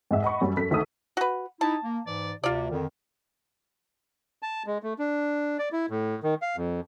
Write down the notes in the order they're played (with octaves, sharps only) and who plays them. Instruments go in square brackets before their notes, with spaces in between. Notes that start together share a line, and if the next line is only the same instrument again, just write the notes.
[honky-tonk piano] G#2 G#3 E5 F#5
D#5 F#5 B5 C#6
F#2 G3 C#4
F#2 A4 B6
D2 D#3 A4 D#6 E6
[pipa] F#4 B4
[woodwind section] D#4 E4 [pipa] A5
[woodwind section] A#3
G#2 E3 D5
[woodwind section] D2 C3 [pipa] F4 D5
[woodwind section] F2 D3 D#3
[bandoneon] A5
G#3
A3
D4
D5
E4
A2
D#3
F5
F2